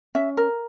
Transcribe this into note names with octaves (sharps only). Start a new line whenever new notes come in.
C#4 E5
A#4